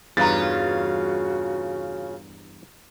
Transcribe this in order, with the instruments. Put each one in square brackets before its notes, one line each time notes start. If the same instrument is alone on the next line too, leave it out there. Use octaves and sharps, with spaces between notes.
[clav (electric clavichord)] E2 G2 B4 [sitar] C#3 F4 [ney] F#4 [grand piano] A#5 A6